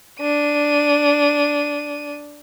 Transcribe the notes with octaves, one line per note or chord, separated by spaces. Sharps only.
D4 D#7